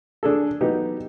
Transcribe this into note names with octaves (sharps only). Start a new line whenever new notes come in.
D4 G#4 A4
F#3 B3 D#4 G4